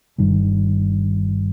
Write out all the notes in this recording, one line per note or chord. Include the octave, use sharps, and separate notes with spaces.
G1 G2 D#3 G3